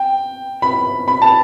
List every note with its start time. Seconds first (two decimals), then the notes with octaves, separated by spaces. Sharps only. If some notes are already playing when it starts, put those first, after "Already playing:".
Already playing: G5
0.62 B5
1.08 B5
1.22 A5